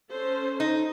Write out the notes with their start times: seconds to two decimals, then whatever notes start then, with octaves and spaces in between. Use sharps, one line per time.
0.11 C#4 A4 C5
0.60 D#4